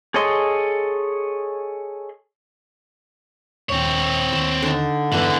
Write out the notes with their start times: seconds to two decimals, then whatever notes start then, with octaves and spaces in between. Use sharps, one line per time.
0.14 G#4 A4 C#5 D#5 C6
3.69 D#1 A#1 D#2 C4 C#5
4.33 D#2 A5
4.62 D3 D#4
5.12 E2 G2 D3 E3 B3 B4 A#5